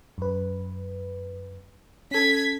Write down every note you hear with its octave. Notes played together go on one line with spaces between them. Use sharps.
F#2 B4
C#4 A4 G#6 B6